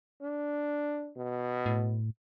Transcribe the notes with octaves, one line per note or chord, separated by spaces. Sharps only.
D4
B2
A2